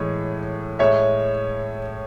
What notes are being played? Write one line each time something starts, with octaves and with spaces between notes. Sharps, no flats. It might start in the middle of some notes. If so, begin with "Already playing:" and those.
Already playing: A2 E3 G#3 C#5
A2 G#3 C#5 E5